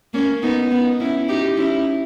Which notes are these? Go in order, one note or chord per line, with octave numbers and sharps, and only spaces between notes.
A#3 C#4
B3 D#4
B3 D#4
C#4 E4
D#4 G4
C#4 E4